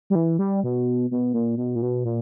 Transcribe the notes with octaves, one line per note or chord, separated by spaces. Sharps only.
G3
E3
G3
B2
B2
A#2
B2
A#2
B2
A#2